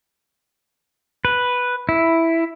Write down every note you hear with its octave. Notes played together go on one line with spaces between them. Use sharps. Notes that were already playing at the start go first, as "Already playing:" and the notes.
B4
E4